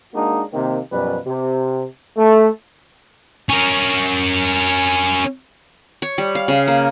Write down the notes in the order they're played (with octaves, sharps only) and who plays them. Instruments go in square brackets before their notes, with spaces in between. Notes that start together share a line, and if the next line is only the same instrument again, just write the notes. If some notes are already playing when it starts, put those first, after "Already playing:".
[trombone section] G#3 A#3 D4 D#4 F#4
C3 D#3 A#3 C4
F#2 B2 F3 G3 B4
C3
A3
[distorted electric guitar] C#4 A#4
[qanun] C#5
G3
F5
C#3
A#3